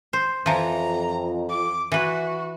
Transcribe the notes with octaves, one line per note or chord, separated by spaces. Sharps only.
C5
F2 E3 F3 A#5
D6
E3 F#4 B4